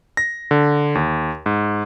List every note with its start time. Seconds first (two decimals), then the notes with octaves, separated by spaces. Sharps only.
0.17 A#6
0.51 D3
0.95 D#2
1.46 G#2